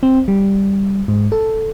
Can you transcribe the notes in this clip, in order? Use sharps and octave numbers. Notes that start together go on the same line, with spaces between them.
C4
G3
G#2
A4